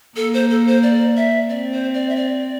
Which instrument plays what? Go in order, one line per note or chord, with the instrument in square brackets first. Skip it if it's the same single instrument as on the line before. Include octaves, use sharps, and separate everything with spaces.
[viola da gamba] A#3 [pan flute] A4
[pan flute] C5
A4
C5
D5
E5
[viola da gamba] C4 [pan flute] D5
[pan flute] C5
D5
E5
D5